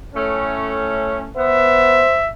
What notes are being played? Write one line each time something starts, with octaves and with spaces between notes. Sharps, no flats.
A2 A3 C#4
B3 C5 E5